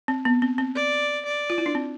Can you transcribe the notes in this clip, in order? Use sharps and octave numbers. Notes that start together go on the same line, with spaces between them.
C4
B3
C4
C4
D5
D5
F4
E4
D4
C4